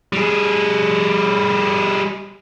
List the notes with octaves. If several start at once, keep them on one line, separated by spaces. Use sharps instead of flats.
G3 G#4